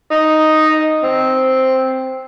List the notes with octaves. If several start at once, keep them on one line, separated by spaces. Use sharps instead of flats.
D#4
C4